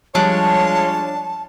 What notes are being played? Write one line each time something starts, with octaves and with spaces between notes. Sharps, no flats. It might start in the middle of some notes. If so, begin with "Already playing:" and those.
F3 G3 G#3 D4 F4 C#5 A5